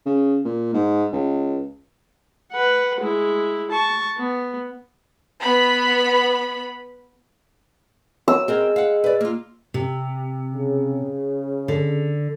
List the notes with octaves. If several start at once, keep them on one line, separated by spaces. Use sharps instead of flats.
C#3
A#2
G#2
C#2
B4 F#5
G#3 E4
A5 C#6
B3
B3 B5
F#3 E6
G#3 C4 A#4 C#5
F5 F#5
B4 D5
A#3 F4
C3
C#3
D3